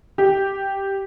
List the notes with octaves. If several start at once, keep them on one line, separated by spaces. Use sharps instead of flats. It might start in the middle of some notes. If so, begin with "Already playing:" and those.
G4